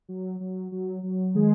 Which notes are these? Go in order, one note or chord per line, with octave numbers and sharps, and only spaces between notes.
F#3
F#3
F#3
F#3
D#3 G#3 G#4